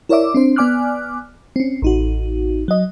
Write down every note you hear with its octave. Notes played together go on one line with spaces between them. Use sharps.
E4 A#4 C#5 D5 E5 D6
C4 D4 C5
B3 D5 G#5 D6 F6 F#6
C4 C#4
A1 D#4 F#4
F#3 D#5